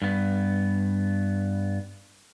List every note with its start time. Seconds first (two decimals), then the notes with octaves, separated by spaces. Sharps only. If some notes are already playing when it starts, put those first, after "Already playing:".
0.02 G2 B3